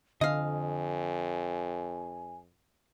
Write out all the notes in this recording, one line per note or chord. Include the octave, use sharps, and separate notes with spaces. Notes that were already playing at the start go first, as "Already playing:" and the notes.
F2 D3 D#5 F5 G#5